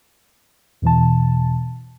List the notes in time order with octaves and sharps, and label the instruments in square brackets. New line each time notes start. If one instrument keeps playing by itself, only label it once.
[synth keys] E2 B2 E3 A5